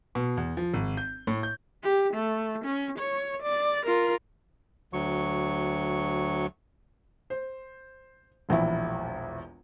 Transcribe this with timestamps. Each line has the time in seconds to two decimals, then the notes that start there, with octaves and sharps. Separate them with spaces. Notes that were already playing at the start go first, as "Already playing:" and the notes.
0.15 B2
0.37 E2
0.57 F3
0.73 G#1
0.97 G6
1.27 A2
1.43 G6
1.83 G4
2.14 A3
2.65 C#4
2.99 C#5
3.42 D5
3.86 F4 A#4
4.93 D2 F#3 C#6
7.30 C5
8.49 E1 A#1 E2 E4